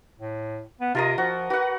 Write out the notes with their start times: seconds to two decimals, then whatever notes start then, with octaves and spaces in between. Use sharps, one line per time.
0.20 A2
0.81 B3
0.95 C3 F4 A#4 D#5
1.18 F3 F#4
1.50 F#4 B4 F#5